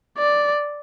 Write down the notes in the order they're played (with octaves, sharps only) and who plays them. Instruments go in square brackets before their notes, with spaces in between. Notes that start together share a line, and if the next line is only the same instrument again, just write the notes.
[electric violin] D5